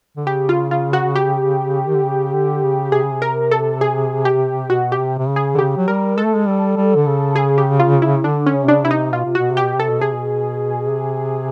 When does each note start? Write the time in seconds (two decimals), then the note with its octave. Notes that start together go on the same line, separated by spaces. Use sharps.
0.17 D3
0.27 C#3 G4
0.49 F4
0.71 F4
0.93 F#4
1.16 G4
1.88 D#3
1.96 D3
2.04 C#3
2.33 D3
2.63 C#3
2.92 C3 G#4
3.02 C#3
3.13 C3
3.22 A#4
3.51 A4
3.81 G#4
4.25 G4
4.70 B2 F#4
4.92 G4
4.99 C3
5.19 C3
5.28 C#3
5.36 G#4
5.55 D3
5.58 C#3 G4
5.77 F#3
5.88 G3 A#4
6.18 G#3 A4
6.26 A3
6.36 G#3
6.48 G3
6.77 G3
6.96 D3
7.06 C#3
7.36 G#4
7.58 G4
7.80 F4
8.02 E4
8.24 D3 D4
8.46 C#4
8.54 C#3
8.63 C3
8.68 C#3 D4
8.84 C3 E4
8.91 D#4
9.13 B2 F4
9.25 C3
9.35 B2 F#4
9.51 C3
9.57 G4
9.64 B2
9.76 C3 A4
9.89 B2
10.01 C3 G#4
10.14 B2
10.90 C3